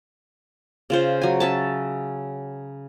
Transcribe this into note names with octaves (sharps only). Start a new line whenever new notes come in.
C#3 F4 C5
F#3 G#5
C#4 E5 A5